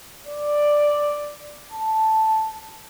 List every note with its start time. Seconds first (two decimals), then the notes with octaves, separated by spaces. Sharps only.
0.27 D5
1.72 A5